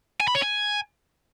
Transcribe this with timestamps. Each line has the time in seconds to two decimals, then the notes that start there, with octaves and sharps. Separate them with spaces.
0.20 G#5
0.27 B5
0.35 C#5
0.42 G#5